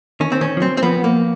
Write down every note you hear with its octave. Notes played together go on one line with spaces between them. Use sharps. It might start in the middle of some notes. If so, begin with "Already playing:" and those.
D#3 C#4
C4
D#3 C#4
F3
F#3 C4
C4
F3 B3
A#3